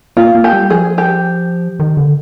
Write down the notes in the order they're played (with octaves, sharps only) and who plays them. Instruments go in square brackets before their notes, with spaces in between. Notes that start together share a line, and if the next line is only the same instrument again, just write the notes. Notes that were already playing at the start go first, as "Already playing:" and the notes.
[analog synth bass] A#3 [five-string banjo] F4
[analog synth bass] A#3
[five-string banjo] G4
[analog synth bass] G3
[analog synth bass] F3 [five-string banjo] G#4
[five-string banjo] G4
[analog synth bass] D#3
D3